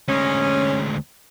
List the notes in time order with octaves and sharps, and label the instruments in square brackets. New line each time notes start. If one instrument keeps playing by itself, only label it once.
[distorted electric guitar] D2 G#3 [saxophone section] C#4